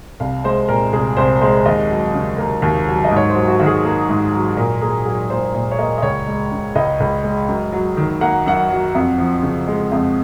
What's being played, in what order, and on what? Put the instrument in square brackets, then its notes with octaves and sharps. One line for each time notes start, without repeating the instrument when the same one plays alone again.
[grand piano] C2 F5
G#3 C5
A#2 A#4
C2 G#4
C2 C5
G#3 C5
D#2 D#5
F#3
C#3
A#3
D#2
F#3
D#5
G#2
C#5
C5
F#3
F#4
D#3 F#4
G#4
A#3
G#2
F#3
A#2 A#4
A#3 G#4
F#3 G#4
A#2 C5
A#2
C#5
A#3 D#5
D#5
C#2 C#5
G#3
C#3
C#2 D#5
C#2
G#3
F#2
F#3
D#3
A#3 F#5
F#2 F#5
F#3
F2
F3
C#3
G#3
F2